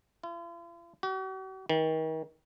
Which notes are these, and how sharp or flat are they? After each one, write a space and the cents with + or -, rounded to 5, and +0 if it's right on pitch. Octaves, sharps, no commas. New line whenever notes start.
F4 -45
F#4 +45
D#3 +35